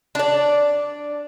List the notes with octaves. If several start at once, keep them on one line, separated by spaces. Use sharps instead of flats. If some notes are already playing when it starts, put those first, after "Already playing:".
D4 D5